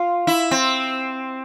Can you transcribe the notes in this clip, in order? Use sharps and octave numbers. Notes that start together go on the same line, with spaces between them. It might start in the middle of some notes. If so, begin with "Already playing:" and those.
Already playing: F4
E4
C4